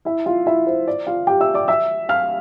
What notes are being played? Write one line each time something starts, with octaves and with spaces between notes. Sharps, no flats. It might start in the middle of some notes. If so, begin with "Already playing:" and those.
E4 E5
F4 F5
E4 E5
C5
D5
F4 F5
G4 G5
E5 E6
D5 D6
E5 E6
F5 F6